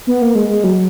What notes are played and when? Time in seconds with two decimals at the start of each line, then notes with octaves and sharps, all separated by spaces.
0.07 B3
0.22 A#3
0.35 G#3
0.49 G#3
0.64 F#3